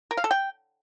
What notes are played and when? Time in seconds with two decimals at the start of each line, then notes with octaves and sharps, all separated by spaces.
0.11 A#4
0.17 F5
0.24 A4
0.31 G5